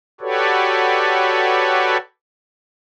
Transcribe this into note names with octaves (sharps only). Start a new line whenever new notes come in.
F#4 G4 A4 B4 C#5 D5